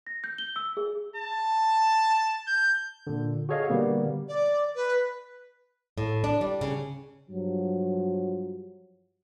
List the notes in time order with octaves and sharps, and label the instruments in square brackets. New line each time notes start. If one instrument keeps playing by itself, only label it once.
[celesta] A#6
G6
G7
E6
G#4
[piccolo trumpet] A5
G6
[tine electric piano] A#2 D3
F#4 G#4 A4 C#5 D#5 F5
B2 D3 G3 A#3 B3
[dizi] D5
B4
[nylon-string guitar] A2
D4
G3
C#3
[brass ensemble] G2 F3 F#3